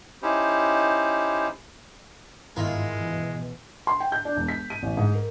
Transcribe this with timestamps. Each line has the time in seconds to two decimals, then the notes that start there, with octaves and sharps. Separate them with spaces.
0.22 C#4 D#4 E4 G4 C5
2.56 G1 G#2 D#3 G#3 E4 F4 A#4 F5
2.93 C#2 B2 E3
3.87 C6
4.00 G5
4.12 G6
4.25 D4
4.36 E1
4.48 B6
4.70 D#7
4.83 A1
4.97 G#2
5.15 A#4